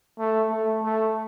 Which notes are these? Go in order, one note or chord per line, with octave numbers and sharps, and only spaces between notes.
A3
A3
A3